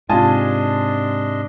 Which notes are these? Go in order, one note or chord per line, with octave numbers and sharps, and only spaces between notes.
G#2 C3 D4 F4 D#5 G#5 A5 C6